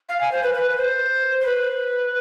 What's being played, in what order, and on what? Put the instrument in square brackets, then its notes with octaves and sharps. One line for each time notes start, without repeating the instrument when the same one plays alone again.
[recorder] F5
G#5
C5
B4
B4
B4
C5
C5
B4